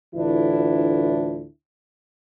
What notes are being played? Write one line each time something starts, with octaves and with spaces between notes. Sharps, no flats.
D2 A2 E3 D4 E4 F4